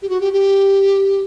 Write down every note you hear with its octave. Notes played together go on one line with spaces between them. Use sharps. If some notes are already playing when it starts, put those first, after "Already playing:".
G4
F#4
G4
G4